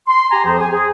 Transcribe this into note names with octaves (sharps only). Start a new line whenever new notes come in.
C6
G4 G#5 A#5
F2 F3 G#4 C5
G#5
G#4